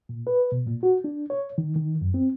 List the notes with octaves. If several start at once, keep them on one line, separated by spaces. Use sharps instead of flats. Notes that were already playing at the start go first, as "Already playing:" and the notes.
A#2
B4
B2
A#2
F#4
D4
C#5
D#3
D#3
F#2
C4